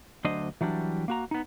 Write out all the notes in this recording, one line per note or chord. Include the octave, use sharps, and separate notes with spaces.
D2 F#3 D4 C5 D#5
E3 F#3 G3 D4
A#3 F#4 A#5
B3 D#4